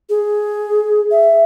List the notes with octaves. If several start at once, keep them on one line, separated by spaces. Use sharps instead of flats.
G#4
E5